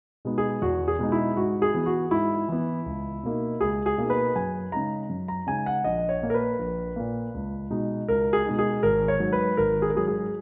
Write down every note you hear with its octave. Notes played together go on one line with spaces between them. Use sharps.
B2 G#3 B3 D#4
G#4
E2 F#4
G#4
B2 G#3 B3 D#4
E4
G#2 F#4
G#4
E3 B3
F#4
G#2 E4
E3 B3
C#2
B2 A#3 D#4
C#2 G#4
G#4
B2 A#3 D#4
B4
F#2 G#5
C#3 G#3 D#4 A#5
F#2
A#5
C#3 G#3 D#4 G#5
F#5
A#1 D#5
C#5
A#2 A#3
A#4
B4
A#1
A#2 A#3
C#2
B2 G#3 D#4
C#2 A#4
G#4
B2 G#3 D#4
G#4
G#1 A#4
C#5
G#2 F#3
B4
G#1 A#4
G#4
A#4
G#2 F#3 G#4
G#4